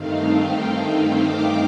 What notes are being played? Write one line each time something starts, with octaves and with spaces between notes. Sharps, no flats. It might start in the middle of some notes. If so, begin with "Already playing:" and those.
Already playing: G2 D#3 A3 C4 D#4 F5
G5
G5
D6